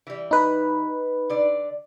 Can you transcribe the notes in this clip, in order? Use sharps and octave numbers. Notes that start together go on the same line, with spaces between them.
E3 G3
D#4 B4
D3 D5